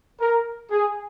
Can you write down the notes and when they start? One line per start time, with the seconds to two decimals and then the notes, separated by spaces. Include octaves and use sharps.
0.20 A#4
0.71 G#4